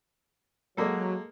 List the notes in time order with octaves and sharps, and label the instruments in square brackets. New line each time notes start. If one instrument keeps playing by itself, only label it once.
[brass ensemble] F#3 [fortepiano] G#3 A#3 A4